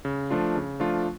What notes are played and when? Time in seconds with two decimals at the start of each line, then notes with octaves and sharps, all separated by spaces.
0.05 C#3
0.30 F3 A3 D4 F4
0.56 C#3
0.80 F3 A3 D4 F4